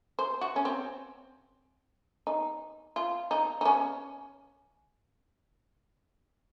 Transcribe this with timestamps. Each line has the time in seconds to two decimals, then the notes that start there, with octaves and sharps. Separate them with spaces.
0.19 C5
0.41 F#4
0.56 C#4
0.65 C4
2.27 D#4
2.96 F4
3.31 D#4
3.61 D#4
3.65 C#4